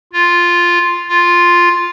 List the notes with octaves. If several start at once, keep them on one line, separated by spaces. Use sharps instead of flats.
F4
F4